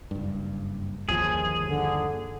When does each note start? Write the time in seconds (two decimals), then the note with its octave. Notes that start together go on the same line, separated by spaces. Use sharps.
0.11 F#1 G2
1.09 G1 D#2 F3 G#4
1.66 D3